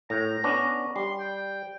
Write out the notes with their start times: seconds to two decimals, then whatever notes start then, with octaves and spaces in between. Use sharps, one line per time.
0.10 A2 A#5
0.44 B3 C#4 D4
0.96 G3 C6
1.20 G5